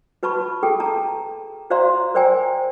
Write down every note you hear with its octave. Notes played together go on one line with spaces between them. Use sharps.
F#4 B4 A5 B5 C#6
G#4 A4 G5
A5 A#5
F#4 C5 D5 F5 A#5 C6
A#4 C5 D5 G5 G#5 A#5